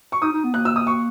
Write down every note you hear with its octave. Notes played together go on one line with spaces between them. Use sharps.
C#6
D#4 D#6
D#4
B3
A#3 F#6
E6
D#6
C#6